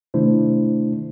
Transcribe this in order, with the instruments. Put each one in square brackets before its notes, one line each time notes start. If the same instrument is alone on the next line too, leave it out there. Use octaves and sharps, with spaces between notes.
[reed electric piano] C3 D#3 A3 D4 E4 C5